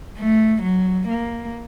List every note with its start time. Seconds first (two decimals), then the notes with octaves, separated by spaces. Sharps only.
0.19 A3
0.64 F#3
1.08 A#3